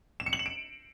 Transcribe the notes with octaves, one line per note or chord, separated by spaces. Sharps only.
E7
C#7
F#7
E7
D7